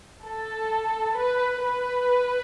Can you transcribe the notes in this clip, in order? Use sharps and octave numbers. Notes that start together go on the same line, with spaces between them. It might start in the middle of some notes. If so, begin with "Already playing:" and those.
A4
B4
B4